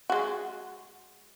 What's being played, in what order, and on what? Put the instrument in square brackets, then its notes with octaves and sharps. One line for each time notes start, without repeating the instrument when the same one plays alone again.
[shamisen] G#3 F#4